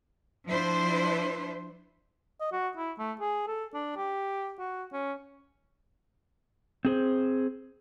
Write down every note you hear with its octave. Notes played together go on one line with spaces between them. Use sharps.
F3 D4 E4 C5
D#5
F#4
E4
A3
G#4
A4
D4
G4
F#4
C#4
C4 G#4 C5